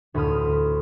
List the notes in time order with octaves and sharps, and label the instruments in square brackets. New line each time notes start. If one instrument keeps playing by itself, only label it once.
[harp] D2 A2 B5 C6 D#6 F6